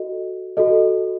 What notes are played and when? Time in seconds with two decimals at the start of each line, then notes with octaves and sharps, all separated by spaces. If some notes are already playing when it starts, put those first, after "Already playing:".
Already playing: F#4 A4 D#5
0.57 F#4 A4 D#5